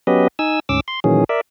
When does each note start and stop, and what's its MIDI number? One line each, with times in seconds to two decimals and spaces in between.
0.07 0.28 54
0.07 0.28 59
0.07 0.28 61
0.07 0.28 67
0.07 0.28 71
0.07 0.28 75
0.39 0.60 63
0.39 0.60 80
0.39 0.60 88
0.69 0.80 38
0.69 0.80 44
0.69 0.80 61
0.69 0.80 86
0.69 0.80 88
0.88 1.00 84
1.04 1.24 46
1.04 1.24 51
1.04 1.24 52
1.04 1.24 54
1.04 1.24 61
1.04 1.24 68
1.29 1.41 70
1.29 1.41 74
1.29 1.41 76